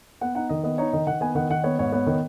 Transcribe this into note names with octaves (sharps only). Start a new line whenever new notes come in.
B3 F#5
D#4 F#5
D#3 D#5
B3 D#5
D#4 C#5
D#3 D#5
D#3 F#5
B3 G#5
D#3 F#5
D#3 F#5
B3 C#5
G#2 C#5
B3 C#5
D#3